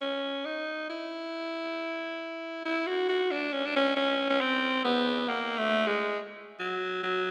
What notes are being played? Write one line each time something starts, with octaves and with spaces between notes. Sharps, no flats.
C#4
D#4
E4
E4
F#4
F#4
D4
C#4
D4
C#4
C#4
C#4
C4
B3
A#3
A3
G#3
F#3
F#3